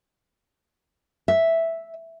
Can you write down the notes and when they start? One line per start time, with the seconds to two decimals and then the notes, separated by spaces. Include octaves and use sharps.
1.28 E5